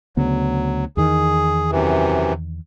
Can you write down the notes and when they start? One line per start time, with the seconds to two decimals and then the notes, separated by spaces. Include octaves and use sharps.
0.17 D2 C#3 F#3 B3
0.97 E2 D#3 G#4
1.71 F#2 C3 E3